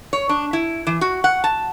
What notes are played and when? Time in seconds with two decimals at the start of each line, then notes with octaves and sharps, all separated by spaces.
0.13 C#5
0.29 D4
0.53 E4
0.87 E3
1.01 F#4
1.24 F#5
1.44 A5